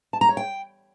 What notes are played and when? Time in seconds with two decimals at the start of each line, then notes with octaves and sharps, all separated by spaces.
0.13 A5
0.21 A#5
0.29 C#5
0.37 G5